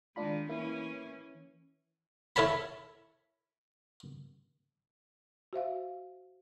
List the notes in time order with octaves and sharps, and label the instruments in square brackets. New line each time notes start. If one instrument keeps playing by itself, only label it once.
[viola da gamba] D#3 G#3 [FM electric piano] D4 F4 B5
[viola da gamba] E3 C#4 [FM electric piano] A#3 E4
[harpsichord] E4 A4 C#5 A5 B5
[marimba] F#4 C5 E5 F5